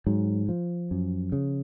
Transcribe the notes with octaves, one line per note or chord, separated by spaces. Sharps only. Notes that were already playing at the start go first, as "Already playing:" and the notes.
G#2 F#3
F3
F#2
C#3